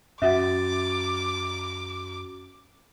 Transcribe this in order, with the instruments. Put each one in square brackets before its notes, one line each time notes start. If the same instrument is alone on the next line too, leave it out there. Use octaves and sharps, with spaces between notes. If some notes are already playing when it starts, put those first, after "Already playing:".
[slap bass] F#2 [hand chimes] C#4 F#4 A6 [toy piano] E5 F#5 [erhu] D6